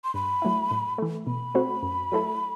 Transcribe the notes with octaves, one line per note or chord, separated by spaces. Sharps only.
C6
G2 B5
F#3 A3 E4
A2
E3 A3
B2 B5
A3 C4 F#4 C5
F#2
F#3 A3 E4 A4